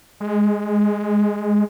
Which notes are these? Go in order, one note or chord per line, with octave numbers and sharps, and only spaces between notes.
G#3